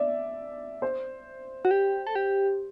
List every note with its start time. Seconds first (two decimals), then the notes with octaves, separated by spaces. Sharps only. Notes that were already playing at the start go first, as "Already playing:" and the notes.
Already playing: D5 E5
0.82 C5
1.65 F#4
1.71 G4
2.07 A4
2.15 G4